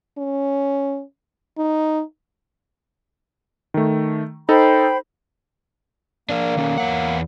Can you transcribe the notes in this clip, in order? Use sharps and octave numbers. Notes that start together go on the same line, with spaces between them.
C#4
D#4
D#3 A3
D#4 A4 C5 G5 B5
A#3 D4 A#4
D#3 C#4
E2 C#5 F#5